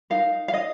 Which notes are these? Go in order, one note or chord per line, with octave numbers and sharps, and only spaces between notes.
D#4 A#4 F5
F5
D#5